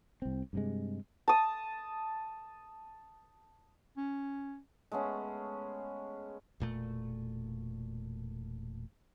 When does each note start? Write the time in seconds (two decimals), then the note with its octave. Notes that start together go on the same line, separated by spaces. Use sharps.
0.22 C2 C4
0.53 G2 C3 G#3
1.28 A5 D#6
3.97 C#4
4.92 G#3 A3 B3 C#4
6.60 E1 A#2 A3